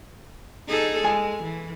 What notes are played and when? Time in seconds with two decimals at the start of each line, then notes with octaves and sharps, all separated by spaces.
0.68 D#4 G#4 A4
1.05 G#3 G#5
1.43 E3